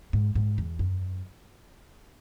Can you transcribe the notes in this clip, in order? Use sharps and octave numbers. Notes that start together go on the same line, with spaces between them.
G#2
G#2
E2
F#2